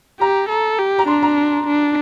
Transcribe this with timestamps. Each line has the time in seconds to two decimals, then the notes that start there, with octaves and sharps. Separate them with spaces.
0.20 G4 A#5
0.49 A4
0.79 G4
0.99 A#5
1.08 D4 C6
1.22 A#5
1.67 D4